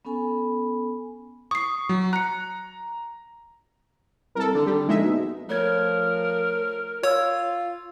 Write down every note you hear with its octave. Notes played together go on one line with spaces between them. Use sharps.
B3 C#4 A4 G#5 B5
C#6 D#6 C7
F#3
A#5 F#6 C#7
C2 A4 A#4
D3
D3 G3
A#1 G#3 D#4 E5
B2
F3 A3 A#4 C#5 G#6
F4 C#5 C#6 E6 G#6